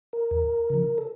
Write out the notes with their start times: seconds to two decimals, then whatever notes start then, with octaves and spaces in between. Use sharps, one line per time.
0.13 A#4
0.31 E2
0.70 C#3 F3
0.98 A4